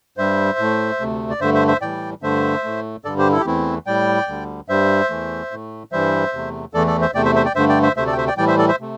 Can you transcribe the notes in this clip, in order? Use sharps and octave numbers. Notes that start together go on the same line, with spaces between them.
G2 G3 C5 E5
A2 A3
D2 C3 A3
D5
G2 D3 A3 C5 E5
C5 E5
C5 E5
A2 E3 G3 D5 G5
G2 D3 A3 C5 E5
A2 A3
G2 D3 G3 A4 D5
G4 C5
E4 A4
G4
E2 E3 A3 C4 E4
A2 G3 D5 G5
D2 D3 G3
G2 G3 C5 E5
E2 E3 A3
A2 A3
G2 E3 G3 C5 E5
E2 C3 A3
E2 E3 A3 A4 D5
A4 D5
C5 E5
E2 C3 A3 D5 G5
C5 E5
C5 E5
D5 G5
G2 D3 A3 C5 E5
D5 G5
C5 E5
D2 C3 A3 C5 E5
A4 D5
G5
C5 E5
D5 G5
A2 E3 G3 D5 G5
C5 E5
A4 D5
C5 E5
C3 A3